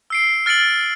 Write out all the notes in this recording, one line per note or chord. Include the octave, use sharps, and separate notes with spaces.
E6 C7 D7
F6 A6 C#7 D7 F#7